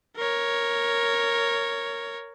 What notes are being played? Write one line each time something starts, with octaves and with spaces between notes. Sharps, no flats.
A#4 C#5